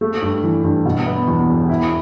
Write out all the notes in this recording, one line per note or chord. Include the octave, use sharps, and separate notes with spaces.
A3
G2
E3
G2
B2
B3
E2
E1
E4